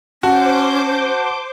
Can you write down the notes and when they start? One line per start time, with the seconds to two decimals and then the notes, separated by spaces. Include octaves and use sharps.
0.23 C#4 F#4 C5 A5 D6 G6